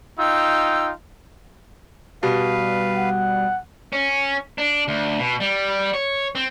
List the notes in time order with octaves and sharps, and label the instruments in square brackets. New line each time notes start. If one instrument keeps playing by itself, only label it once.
[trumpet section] D#4 F4 G5 [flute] E6
[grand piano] B2 [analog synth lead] G3 [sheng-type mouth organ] B4 F5
[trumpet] F#5
[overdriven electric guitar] C#4
D4
D2
B2
G3
C#5
C4